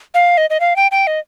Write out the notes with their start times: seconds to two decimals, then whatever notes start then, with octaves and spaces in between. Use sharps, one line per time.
0.14 F5
0.37 D#5
0.50 D#5
0.60 F5
0.76 G5
0.91 G5
1.07 D#5